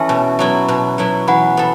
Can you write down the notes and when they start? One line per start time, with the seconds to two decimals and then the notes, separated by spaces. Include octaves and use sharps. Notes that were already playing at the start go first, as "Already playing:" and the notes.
Already playing: E3 C#4 A4 E5 A5
0.09 B2
0.39 F#3 B3 E4
0.68 B2
0.98 F#3 B3 E4
1.28 E3 F#5 B5
1.57 B3 A4